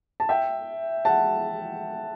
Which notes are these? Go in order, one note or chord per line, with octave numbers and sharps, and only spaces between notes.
A5
E5 G5
F#5 A5